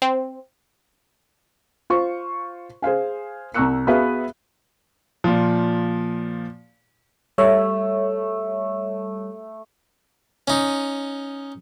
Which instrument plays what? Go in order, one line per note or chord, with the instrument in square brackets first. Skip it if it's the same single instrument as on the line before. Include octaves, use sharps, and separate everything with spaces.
[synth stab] C4
[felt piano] F4 C5 C#6
G#4 C5 F5 G#5
C2 A#5 C#6 E6 F#6 C#7
B3 F#4 G#4 B4 E5 F5
[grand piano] A#2 F3
[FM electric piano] G3 C#5 E5 [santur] A3
[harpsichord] C#4 D#4